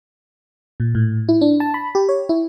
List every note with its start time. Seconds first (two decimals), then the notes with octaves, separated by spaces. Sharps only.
0.80 A#2
0.95 A2
1.29 E4
1.41 D4
1.60 A5
1.74 B5
1.95 G4
2.09 C#5
2.29 E4